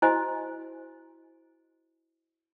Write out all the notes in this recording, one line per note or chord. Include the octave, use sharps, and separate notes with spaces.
E4 F#4 C5 D#5 G#5